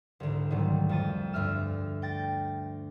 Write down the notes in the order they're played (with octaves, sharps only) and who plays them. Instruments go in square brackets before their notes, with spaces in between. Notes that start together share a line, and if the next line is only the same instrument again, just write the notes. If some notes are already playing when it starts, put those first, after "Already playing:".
[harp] C2 G#2 D3 E3
G#2 C3 D#3 F#3 G3 A3
F2 A5 D#7
D2 G2 E5 F6 E7
G5 A6 A#6